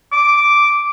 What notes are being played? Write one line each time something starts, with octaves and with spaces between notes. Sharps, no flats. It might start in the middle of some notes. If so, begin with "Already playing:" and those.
D6